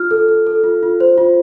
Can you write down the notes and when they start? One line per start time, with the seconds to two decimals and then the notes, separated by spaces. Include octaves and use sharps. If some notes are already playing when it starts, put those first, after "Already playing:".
Already playing: F4 F6
0.11 A4
0.29 A4
0.47 A4
0.64 F4
0.83 F4
1.00 C5
1.18 F4